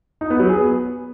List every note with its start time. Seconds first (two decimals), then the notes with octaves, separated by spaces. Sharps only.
0.21 D#4
0.30 B3
0.40 F#3
0.49 G#4
0.58 B3